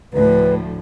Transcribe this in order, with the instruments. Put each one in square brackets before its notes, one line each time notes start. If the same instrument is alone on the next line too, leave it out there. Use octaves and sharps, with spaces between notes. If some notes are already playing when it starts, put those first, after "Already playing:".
[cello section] D2 A2 F3 [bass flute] B4